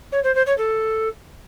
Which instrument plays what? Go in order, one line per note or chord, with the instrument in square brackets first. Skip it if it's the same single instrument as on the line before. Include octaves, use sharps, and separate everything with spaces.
[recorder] C#5
C5
C5
C#5
A4